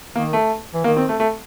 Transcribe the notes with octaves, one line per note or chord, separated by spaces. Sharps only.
D#3 A#3
A3
E3
D#3 A#3
C4
A3
A3